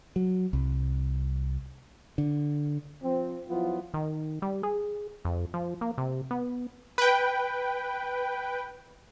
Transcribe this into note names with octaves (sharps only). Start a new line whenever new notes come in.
F#3
C2
D3
F3 C4
F3 F#3 B3 E4 F4
D#3
G3
G#4
F2
F3
A#3
C3
B3
B4 G5